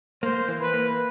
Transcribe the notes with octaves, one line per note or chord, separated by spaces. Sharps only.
A#3 C5
E3
B4
A#3